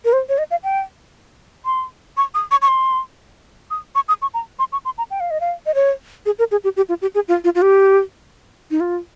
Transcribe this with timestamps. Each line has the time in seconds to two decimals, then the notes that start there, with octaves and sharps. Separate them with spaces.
0.05 A#4
0.13 C5
0.29 C#5
0.38 D#5
0.51 F5
0.64 G5
1.66 C6
2.17 C#6
2.34 D#6
2.51 C#6
2.62 C#6
2.68 C6
3.71 D#6
3.95 C#6
4.08 D#6
4.22 C#6
4.34 A#5
4.59 C6
4.72 C#6
4.85 C6
4.98 A#5
5.11 G5
5.20 F5
5.31 D#5
5.41 F5
5.66 D#5
5.75 C#5
6.26 G#4
6.39 A#4
6.51 G#4
6.64 G4
6.77 G4
6.89 F4
7.02 G4
7.15 G#4
7.28 F4
7.44 F4
7.55 F4
7.62 G4
8.71 D#4
8.80 F4